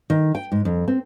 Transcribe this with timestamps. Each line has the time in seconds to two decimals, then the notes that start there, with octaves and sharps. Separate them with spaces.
0.10 D#3
0.35 G5
0.52 G#2
0.65 F2
0.88 C4